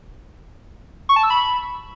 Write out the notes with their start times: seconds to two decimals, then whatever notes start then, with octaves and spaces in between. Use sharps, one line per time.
1.09 C#6
1.16 A5
1.23 E6
1.30 B5